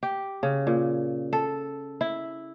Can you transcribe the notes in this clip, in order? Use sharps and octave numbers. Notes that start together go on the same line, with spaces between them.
G4
C#3
A#2
A4
E4